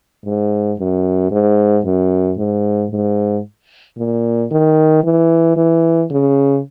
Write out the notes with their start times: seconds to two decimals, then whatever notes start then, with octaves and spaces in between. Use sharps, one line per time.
0.25 G#2
0.79 F#2
1.31 G#2
1.85 F#2
2.38 G#2
2.91 G#2
3.98 A#2
4.51 D#3
5.04 E3
5.56 E3
6.11 C#3